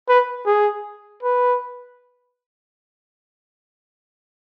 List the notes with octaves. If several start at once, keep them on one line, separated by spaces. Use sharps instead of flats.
B4
G#4
B4